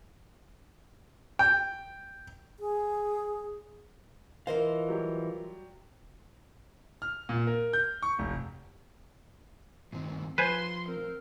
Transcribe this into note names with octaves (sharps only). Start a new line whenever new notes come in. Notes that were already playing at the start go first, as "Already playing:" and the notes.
G5
G#4
E3 F4 A#4 C5 D#5 F5
F#3 G3 G4
F6
A#2
A#4
G6
C#6
F1
G2 D#3 C4
F3 B4 C5 G#5 C6
C4 A#4